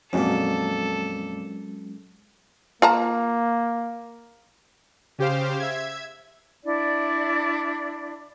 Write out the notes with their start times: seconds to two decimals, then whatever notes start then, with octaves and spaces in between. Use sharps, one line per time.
0.13 F2 A#2 F#3 G#3 C#4 A4
2.82 A#3 F4 A5 A#5
5.18 C#3 G4 C5 F5
5.60 E5 G#6
6.64 D4 E4 D5